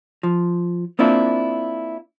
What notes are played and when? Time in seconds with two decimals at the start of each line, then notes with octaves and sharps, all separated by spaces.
0.23 F3
0.99 A#3 C4 D4 E4 F4